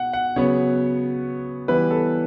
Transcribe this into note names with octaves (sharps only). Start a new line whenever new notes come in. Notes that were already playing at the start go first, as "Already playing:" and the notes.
Already playing: B2 F#5
F#5
C#3 F#3 B3 C#5
E3 G3 B3 E4 B4
A4